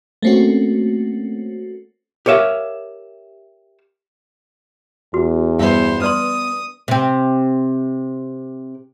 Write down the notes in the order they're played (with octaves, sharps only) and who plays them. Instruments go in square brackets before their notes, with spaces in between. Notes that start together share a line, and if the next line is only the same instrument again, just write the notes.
[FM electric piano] A3 A#3 C4 C#4 F#4
[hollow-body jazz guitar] G4 A#4 C#5 E5 F5
[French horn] E2 [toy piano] F#4
[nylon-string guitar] G2 E5 [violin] B3 C5
[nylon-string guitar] B3 [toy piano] B4 D5 C6 [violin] D#6
[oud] C3 C4